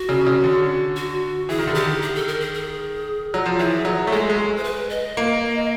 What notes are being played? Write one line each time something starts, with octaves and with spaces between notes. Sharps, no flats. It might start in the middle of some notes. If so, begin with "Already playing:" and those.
Already playing: F#4
C#3
C#3
D3
F#4
E3 G#4
D#3
D3
D#3 G4
G#4
A4
A#4
G#4
G#4
F#3
F3
E3 G#4
F#3
A3
G#3 A4
G#3
C5
B4
D#5
A#3